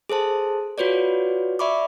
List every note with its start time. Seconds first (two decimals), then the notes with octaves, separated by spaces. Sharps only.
0.09 G#4 A4 C5 A5
0.78 F4 F#4 B4 C#5 D5
1.59 D5 E5 B5 C#6 D6